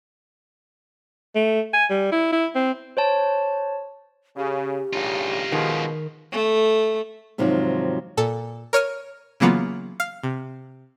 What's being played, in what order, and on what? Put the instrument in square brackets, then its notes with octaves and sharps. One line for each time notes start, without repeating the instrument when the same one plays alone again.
[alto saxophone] A3
G#5
G3
E4
E4
C4
[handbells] C5 C#5 A5
[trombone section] C#3 [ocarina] G4
[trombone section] A1 G2 C#3 [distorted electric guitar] D#4 F4
[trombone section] B2 F3 G#3 [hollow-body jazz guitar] D#3
[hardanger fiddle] A3
[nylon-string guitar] G#2 C3 D#3 F3 F#3
[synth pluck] A#2 A4
A#4 C#5 F6 D#7
C#3 E3 F#3 A#3 B3 F4
F5
C3